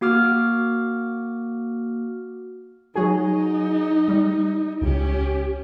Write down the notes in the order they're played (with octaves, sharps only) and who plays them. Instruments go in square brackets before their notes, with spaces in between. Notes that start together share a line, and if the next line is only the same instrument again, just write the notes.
[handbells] A#3 F#4 D6 F6
[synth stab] F#3 F#4 G#4 [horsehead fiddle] D#4
[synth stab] G3
[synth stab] C#2 [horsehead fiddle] C#4 G4